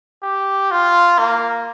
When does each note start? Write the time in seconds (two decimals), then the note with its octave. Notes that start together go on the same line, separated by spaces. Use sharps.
0.23 G4
0.71 F4
1.19 A#3